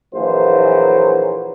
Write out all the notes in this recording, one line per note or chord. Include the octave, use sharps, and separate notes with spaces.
A#1 E3 F#3 A#3 C5